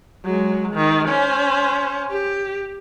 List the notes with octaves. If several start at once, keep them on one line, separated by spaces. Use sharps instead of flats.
F#3 G#3
D#3
C#4 C5
G4